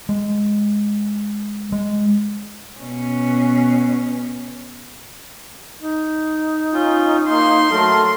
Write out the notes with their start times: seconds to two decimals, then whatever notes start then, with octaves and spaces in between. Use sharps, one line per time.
0.09 G#3
1.72 G#3
2.80 B2 C#4
5.81 D#4
6.73 C#4 F4
7.29 A#3 C6
7.71 F#3 A3 A4 A#4